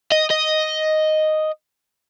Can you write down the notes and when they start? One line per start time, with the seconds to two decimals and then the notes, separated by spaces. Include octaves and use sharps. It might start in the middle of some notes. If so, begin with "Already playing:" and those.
0.12 D#5
0.31 D#5